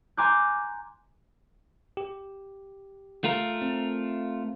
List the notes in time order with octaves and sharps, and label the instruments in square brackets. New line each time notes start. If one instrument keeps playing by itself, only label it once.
[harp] G#5 A#5 C6 D6 F#6 G6
[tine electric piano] G4
[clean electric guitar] A3 F4 A#4
[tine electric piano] C4